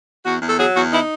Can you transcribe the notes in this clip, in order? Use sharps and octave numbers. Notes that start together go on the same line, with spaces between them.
E2 F#4
E2
A4
F#3 G#4
E2 F#4
D#4 E4